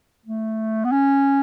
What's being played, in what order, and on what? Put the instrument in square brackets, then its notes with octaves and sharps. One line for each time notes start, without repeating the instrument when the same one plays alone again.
[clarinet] A3
B3
C#4